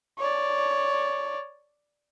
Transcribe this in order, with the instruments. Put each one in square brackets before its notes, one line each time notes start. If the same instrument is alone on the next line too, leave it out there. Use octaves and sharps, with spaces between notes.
[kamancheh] C#5 D5